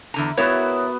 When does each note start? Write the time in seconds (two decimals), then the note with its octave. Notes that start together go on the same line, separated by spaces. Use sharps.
0.14 E2 D3 A#5
0.37 B3 E4 F#4 A#4 C#5